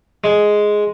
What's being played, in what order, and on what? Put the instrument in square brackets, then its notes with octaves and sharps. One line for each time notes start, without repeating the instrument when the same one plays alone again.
[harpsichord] G#3